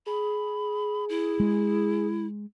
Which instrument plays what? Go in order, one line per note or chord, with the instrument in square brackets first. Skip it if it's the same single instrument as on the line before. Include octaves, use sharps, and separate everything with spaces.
[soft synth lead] G#4 [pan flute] B5
[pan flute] E4
[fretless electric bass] G#3